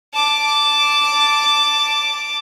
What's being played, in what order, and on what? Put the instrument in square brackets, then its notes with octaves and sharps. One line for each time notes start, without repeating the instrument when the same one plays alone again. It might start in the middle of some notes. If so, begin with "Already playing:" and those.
[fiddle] A5 D6